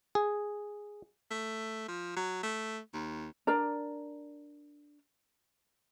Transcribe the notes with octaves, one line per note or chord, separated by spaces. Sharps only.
G#4
A3
F3
F#3
A3
D#2
D4 A#4 D5 A#5